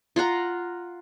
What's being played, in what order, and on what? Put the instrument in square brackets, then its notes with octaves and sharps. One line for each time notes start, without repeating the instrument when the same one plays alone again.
[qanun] F4 F5 F#5 A#5